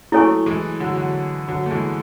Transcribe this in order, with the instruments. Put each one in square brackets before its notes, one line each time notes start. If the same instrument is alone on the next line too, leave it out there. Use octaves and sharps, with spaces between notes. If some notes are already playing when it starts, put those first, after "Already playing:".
[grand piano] F#3 A3 [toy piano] E4 A4 C#5 G#5 C#6
[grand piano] E3 G#3
D3 F#3
D3 F#3
D3 F#3
A3
E3 G#3